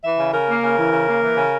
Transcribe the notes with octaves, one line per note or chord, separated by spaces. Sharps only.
E3 E5
C#3
C#3 A#4
A#3
C#3
E3
C#3
A#3
E3
C#3